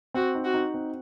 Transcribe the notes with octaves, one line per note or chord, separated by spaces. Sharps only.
C4 F#4
D#4
F#4
D#4
C4